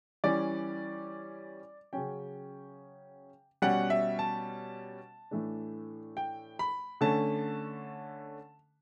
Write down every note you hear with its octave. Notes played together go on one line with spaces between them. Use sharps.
E3 G3 C#4 D5
C#3 F#3 C#4 G5
B2 G3 C#4 F#5
E5
A5
A2 E3 A3 D4
G5
B5
D3 A3 C#4 A5